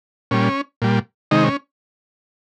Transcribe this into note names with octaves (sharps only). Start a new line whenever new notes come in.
A#2 G3 C#4
A#2 G3
C3 D#3 G#3 D#4
C#4